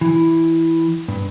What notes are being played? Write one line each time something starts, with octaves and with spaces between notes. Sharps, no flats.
E3
G2